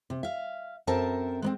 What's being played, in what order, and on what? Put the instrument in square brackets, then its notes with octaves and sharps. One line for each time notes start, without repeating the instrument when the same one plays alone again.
[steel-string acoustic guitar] C3
E5 F5
F#2 C4 A4 A#4 E5 A5
G#3 B3 C4